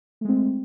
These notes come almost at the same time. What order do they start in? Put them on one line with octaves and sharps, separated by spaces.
A3 G#3 C4